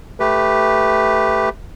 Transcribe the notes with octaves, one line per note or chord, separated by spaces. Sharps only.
A3 G4 B4